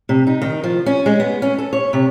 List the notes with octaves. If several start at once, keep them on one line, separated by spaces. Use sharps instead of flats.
C3
D#4
D#3
F3
C#4
G#3
B3
C#4
A4
C#5
C3